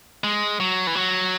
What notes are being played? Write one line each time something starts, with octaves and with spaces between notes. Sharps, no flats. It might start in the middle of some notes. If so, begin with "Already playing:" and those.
G#3
F#3
E3
F#3